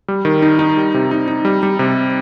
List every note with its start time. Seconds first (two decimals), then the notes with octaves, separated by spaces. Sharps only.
0.08 G3
0.25 D#3
0.42 D#4
0.59 D#4
0.77 G3
0.94 C3
1.11 D#4
1.28 D#4
1.45 G3
1.63 G3
1.79 C3